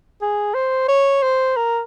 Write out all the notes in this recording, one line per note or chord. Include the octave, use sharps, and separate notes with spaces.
G#4
C5
C#5
C5
A#4